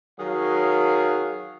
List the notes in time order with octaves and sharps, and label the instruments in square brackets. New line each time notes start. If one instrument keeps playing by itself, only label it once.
[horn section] D#3 F#3 G#4 F5